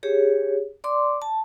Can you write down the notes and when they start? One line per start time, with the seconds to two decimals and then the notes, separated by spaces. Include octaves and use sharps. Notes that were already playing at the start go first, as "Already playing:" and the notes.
0.03 G4 G#4 C#5
0.84 D5 C6 D6
1.22 A5